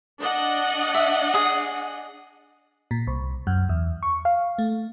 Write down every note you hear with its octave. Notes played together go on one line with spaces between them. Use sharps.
D4 D#5 F#5
E5
G#4 D#6
A#2
C2
F#2
E2
C#6
F5
A3